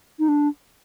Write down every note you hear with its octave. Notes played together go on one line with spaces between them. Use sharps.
D#4
D4